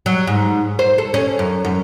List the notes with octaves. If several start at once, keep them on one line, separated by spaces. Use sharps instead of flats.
F#3
G#2
C5
A4
C#4
F#2
F#2